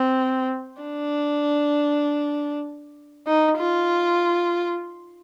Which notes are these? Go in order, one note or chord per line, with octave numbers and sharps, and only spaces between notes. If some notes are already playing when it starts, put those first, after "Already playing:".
Already playing: C4
D4
D#4
F4